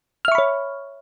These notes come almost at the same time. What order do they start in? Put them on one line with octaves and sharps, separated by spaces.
F6 E5 C#6 B5 C#5